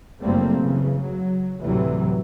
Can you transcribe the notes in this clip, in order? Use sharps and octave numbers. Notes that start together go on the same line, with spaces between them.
F#1 G3 A3 A#3 C4
C#3 E3
F#3
D2 A2 C3 E3 F#3 G3